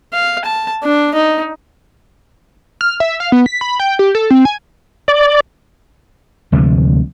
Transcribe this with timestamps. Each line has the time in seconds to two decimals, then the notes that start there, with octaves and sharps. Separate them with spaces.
0.13 F5
0.44 A5
0.84 D4
1.14 D#4
2.81 F6
3.00 E5
3.20 F5
3.32 B3
3.46 B6
3.61 B5
3.80 G5
3.99 G4
4.15 A4
4.30 C4
4.45 G#5
5.08 D5
6.52 D2 C3 F3 G#3